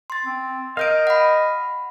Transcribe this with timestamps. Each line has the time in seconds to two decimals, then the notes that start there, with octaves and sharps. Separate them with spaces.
0.10 C6 A6
0.25 C4
0.77 A#4 D#5 F5 G6 D7
1.07 F#5 B5